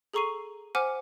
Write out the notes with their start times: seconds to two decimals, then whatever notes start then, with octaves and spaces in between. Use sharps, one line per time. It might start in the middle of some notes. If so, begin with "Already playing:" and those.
0.14 G#4 A4 A#5 C#6 C7 D#7
0.75 C5 F#5 G#5 D6 F6